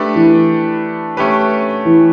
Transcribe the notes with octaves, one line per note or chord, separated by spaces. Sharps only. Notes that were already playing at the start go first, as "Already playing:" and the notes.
Already playing: A3 D4 G4 B4
E3
A3 C#4 G4 B4
E3